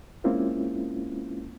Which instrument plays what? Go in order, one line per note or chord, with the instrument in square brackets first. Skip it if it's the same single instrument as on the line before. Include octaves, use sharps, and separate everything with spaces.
[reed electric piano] G#3 A#3 C4 C#4 E4 F4